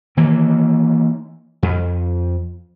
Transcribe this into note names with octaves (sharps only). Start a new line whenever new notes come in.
D#3 E3 A#3
F2